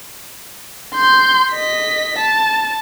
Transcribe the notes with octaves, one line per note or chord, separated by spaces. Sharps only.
C6 G6
D#5 B6
A5